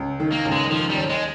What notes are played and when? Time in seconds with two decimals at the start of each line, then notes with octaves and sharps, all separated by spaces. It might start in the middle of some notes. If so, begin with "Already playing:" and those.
Already playing: C#2
0.20 D#3
0.32 A#3
0.45 C#2
0.51 G#3
0.71 D#3 F3
0.90 G3
0.96 D#2
1.09 G#3